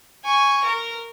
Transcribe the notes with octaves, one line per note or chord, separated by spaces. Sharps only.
G#5 C#6
A#4